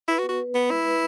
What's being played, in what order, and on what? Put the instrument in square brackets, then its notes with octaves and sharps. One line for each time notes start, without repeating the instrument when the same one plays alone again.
[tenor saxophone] E4 [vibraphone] B4
[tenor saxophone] F#4
[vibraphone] B3
[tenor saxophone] F#4
[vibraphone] B4
[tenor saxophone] B3 [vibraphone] B4
[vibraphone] G#3 [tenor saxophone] E4
[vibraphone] B4